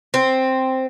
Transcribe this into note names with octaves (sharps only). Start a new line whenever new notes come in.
C4